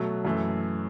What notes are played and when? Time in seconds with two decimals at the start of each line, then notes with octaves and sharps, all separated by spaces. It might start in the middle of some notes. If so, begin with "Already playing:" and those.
Already playing: B2 F#3 A3
0.25 F#2 E3 A3